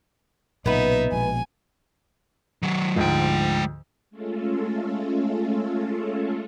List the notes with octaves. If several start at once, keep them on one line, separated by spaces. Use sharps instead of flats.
B1 A#2 C#3 B3 D#4 B4 E5
A#1 B2 G#3 G#5
D#3 F#3
D2 G#2 F3 G#3 G5
G#3 A3 C#4 F4 A4